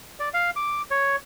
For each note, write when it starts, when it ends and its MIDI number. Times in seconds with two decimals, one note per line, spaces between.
0.20 0.29 74
0.34 0.50 77
0.56 0.82 86
0.91 1.16 73